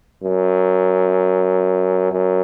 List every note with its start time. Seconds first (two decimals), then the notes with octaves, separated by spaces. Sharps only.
0.23 F#2
2.12 F#2